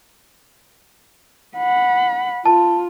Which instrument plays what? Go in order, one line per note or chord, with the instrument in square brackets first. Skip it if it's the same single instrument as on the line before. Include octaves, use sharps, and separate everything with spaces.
[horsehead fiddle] F#5 B5
[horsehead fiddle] F4 [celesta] A5